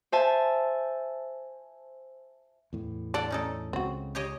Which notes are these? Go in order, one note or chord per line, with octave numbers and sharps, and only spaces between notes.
C5 E5 G#5 A5
E2 A2
D4 A4 D5 F#5
C#4 D#4 A4
C#2 C#3 C4 F#4
G4 C#5 D#5